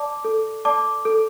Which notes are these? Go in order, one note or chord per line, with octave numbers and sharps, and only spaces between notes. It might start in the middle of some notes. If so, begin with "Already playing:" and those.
Already playing: D5 A5 D6
A4
D5 A5 D6
A4